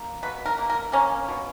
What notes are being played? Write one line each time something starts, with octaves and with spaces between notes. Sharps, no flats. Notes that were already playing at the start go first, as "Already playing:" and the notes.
Already playing: A#3
B2 B4
A#4
A#3
A#4
A#3 C#4
B2